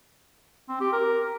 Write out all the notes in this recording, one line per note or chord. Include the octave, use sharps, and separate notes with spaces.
C4
G4
A#4